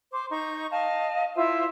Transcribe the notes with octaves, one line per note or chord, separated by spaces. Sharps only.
C5 D6
D#4 C#6 G6
D#5 F5 A5
E4 F4 C5 E5